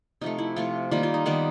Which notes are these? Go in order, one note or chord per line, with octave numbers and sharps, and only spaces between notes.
C3 F3 A3 D#4
E4
C3 F3 A3 F4
D#3 G3 A#3 F4
F4
D#4
D#3 G3 A#3 B3